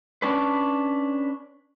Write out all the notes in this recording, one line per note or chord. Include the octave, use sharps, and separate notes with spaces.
C#4 D4 B4